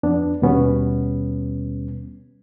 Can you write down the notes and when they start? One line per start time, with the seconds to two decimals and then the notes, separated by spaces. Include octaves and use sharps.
0.03 F2 B3 D4
0.42 D#2 B2 G3 B3 C#4